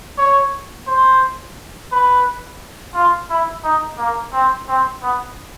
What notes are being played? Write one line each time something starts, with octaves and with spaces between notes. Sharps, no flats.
C#5
C5
B4
F4
E4
D#4
A#3
C4
C4
B3